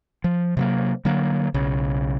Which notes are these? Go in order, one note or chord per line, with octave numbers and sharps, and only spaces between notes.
F3
C3 F#3 A#3
D3 F#3 A#3
B1 C#3